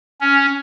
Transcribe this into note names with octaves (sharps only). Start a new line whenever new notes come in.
C#4